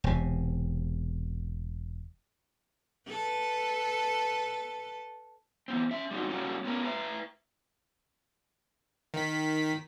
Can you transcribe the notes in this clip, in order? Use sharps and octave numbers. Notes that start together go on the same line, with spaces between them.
E1 C3
A4 B4
E3 B3 C4
C#4 E5
G3 C4 D#4 F#4
G3 A#3 C#4 F#4 A#4
B3 C#4 A#4
B4 E5 A#5
D#3 B6